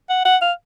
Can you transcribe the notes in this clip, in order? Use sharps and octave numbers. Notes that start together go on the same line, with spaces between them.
F#5
F#5
F5